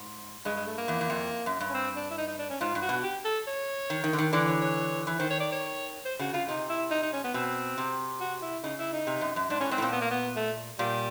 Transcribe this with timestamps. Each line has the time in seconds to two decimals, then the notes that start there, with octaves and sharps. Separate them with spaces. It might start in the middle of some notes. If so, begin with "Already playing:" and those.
Already playing: G#2
0.45 G2 G#3
0.56 G#3
0.67 A3
0.78 A#3
0.88 E2
1.01 E2
1.10 F2
1.46 F#2
1.60 G2
1.70 C#4
1.74 C4
1.96 D4
2.10 E4
2.18 D#4
2.28 D#4
2.39 D4
2.50 C#4
2.60 G#2 F4
2.75 G2
2.82 F#4
2.89 B2
3.03 G4
3.25 A4
3.47 C#5
3.90 D#3
4.04 D#3
4.13 D3
4.18 D#3
4.33 D3 E3 D5
4.48 C#5
4.62 C#5
5.07 E3
5.19 D#3 C5
5.30 C#5
5.40 D5
5.52 C#5
6.05 C5
6.19 C#3 F#4
6.33 C#3 F4
6.49 C3 D#4
6.69 E4
6.91 D#4
7.03 D#4
7.13 C#4
7.24 B3
7.34 B2 C4
7.78 C3
8.20 F#4
8.42 E4
8.63 C#3 D#4
8.78 E4
8.93 D#4
9.07 C3
9.21 F#2
9.36 F#2
9.50 G#2 D4
9.60 A2 C#4
9.71 G#2 C4
9.78 A2
9.82 A#2 C4
9.92 B3
10.01 A#3
10.11 B3
10.36 A3
10.79 A#2 G3